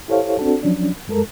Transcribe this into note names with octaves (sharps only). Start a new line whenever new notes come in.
E4 G4 A4 C5 C#5 F5
C4 D4 F#4 A4
F3 F#3 C#4 D4
F#2 G#3 A4 A#4